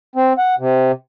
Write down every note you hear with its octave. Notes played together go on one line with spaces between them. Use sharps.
C4
F#5
C3